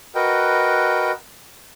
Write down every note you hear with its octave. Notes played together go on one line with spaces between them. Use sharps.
F#4 A#4 B4 D#5 G5